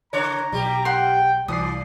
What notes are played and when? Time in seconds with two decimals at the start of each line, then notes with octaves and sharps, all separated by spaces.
0.13 C#3 C#5 A#5
0.52 B1 G3 G4
0.85 F#5 G5 C6
1.48 C2 E3 D5 D#6 C7